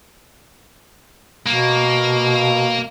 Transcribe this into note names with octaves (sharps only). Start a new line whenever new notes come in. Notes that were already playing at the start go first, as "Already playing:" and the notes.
B2 A#3